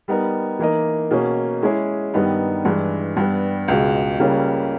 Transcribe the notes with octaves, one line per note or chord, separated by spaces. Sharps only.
G3 B3 D#4 A#4
E3 A#3 D#4 A#4 D#5
B2 A#3 C#4 G#4
G#3 C#4 E4 G#4
G2 D#3 G3 B3 D#4
G2 E3 G#3
G2 G3 B3
C#2 B2 G#3
C#2 C#3 G3 A#3 C#4